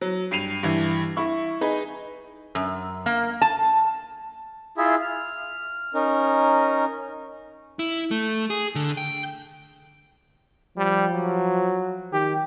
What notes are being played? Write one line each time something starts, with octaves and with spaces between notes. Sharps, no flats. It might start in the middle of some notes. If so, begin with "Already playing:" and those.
F#3
G2 C7 D#7 F7
G2 E3
E4 C#6
D#4 G#4 B4
F#2
A#3
A5
E4 F4 G#4 E5
F6
C#4 D#4 A#4
E4
A3
G#4
D3
G5
F3 G3
F#3
D#3 G4